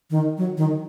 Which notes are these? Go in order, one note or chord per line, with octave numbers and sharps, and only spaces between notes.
D#3
F#3
D#3